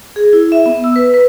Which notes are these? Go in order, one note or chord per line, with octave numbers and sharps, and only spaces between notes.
G#4
E4
E5
B3
E6
B4
B4